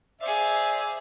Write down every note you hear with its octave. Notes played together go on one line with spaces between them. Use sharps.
G#4 C5 D5 E5 F5